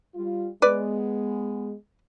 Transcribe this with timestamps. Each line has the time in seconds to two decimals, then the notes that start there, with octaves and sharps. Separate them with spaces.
0.15 G3 F4
0.62 G#3 B3 B4 D5